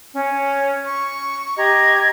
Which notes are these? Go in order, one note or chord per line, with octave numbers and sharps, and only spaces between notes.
C#4 C#5
C#6
G4 D#5 A#5 G#6